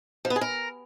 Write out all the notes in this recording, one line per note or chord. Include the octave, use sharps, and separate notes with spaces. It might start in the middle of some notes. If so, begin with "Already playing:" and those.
F3
B3
G#4
A#4